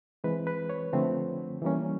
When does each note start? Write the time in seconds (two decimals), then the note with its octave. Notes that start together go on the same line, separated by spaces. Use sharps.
0.24 E3 G#3 C4 B4
0.47 B4
0.70 C#5
0.93 D3 F3 A3 C4
1.62 E3 G3 A#3 C#4